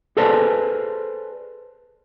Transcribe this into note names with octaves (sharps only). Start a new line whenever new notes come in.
G#4 A4 B4 C5 D5 A5